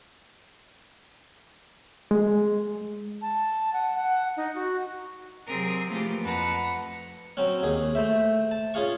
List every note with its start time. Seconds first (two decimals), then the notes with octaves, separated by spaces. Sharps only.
2.11 G#3
3.22 A5
3.73 F#5
3.95 F#5
4.37 D#4
4.55 F#4
5.46 C3 F#3 C4 G#4 A#4
5.90 E3 F3 A3 A#3 G4
6.22 F2 B4 F#5 A5 A#5
7.37 F#3 C4 C#4
7.63 D#2 G#4
7.95 A3 C5 E5
8.51 A5
8.74 C#4 F4 G#4 F5 C#6